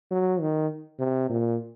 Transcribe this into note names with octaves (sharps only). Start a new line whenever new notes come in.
F#3
D#3
C3
A#2